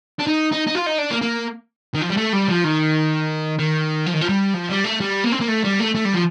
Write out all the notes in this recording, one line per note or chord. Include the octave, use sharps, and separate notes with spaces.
D4
D#4
D#4
D#4
F4
D#4
D4
A#3
A#3
D#3
F3
G3
A3
G3
F3
D#3
D#3
F3
D#3
F3
G3
F3
G3
A3
G3
A#3
C4
A#3
A3
G3
A3
A3
G3
F3